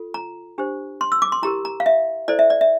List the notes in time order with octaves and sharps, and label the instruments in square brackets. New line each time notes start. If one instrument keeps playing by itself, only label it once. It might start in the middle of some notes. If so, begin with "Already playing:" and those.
Already playing: [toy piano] F4 A4
A#5
D4 G4 C5
C6
E6
D6
C6
E4 G4 A#4 A#5
A#5
F5
E5
E4 A4 C5 D5
E5
D5
E5